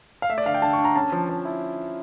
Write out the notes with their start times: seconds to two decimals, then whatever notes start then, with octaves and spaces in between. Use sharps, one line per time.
0.22 F5
0.29 A3 E5
0.38 D5
0.46 D3 F5
0.54 G5
0.62 D3 A5
0.73 C#6
0.78 D4
0.85 A#5
0.95 C#4 A5
1.12 F3
1.29 F3
1.45 E4